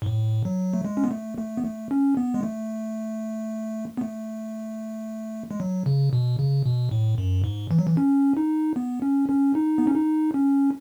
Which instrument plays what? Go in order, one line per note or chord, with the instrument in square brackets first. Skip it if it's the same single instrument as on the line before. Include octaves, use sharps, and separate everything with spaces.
[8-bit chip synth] G#2
A2
F#3
A3
G#3
C#4
B3
A3
A3
B3
A3
C#4
B3
G#3
A3
B3
A3
G#3
F#3
C#3
B2
C#3
B2
A2
F#2
G#2
E3
F#3
E3
C#4
D#4
B3
C#4
C#4
D#4
B3
C#4
D#4
C#4